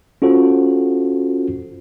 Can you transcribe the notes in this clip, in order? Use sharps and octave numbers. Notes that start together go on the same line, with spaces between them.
C#4 F4 F#4 A4 C5